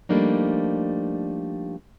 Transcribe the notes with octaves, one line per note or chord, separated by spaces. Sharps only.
F3 G3 A3 A#3 D4 D#4